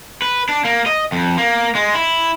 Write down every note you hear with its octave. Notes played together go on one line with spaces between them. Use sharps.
B4
D4
A#3
D#5
F2
A#3
G#3
E4